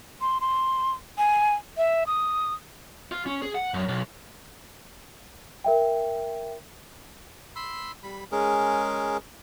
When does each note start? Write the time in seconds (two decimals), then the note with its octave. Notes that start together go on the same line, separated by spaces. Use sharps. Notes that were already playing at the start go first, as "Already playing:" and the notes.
0.21 C6
0.41 C6
1.18 G#5
1.77 E5
2.07 D#6
3.12 F4
3.26 C#4
3.42 G#4
3.55 F#5
3.74 F#2
3.88 B1
5.64 A#4 E5 G5
7.56 B5 C6 E6
8.03 G3 B5
8.32 G#3 C#4 G#4 A#4